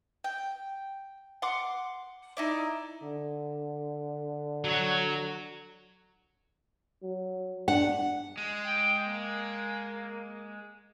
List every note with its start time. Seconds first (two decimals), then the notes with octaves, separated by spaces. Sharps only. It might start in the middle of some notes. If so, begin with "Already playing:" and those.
0.24 G5
1.42 F#5 C6 D6
2.37 D#4 E4 D5
3.03 D3
4.64 F#3 C#5
7.02 F#3
7.68 D4 F#5
8.37 G#3
8.66 G5
9.07 A#3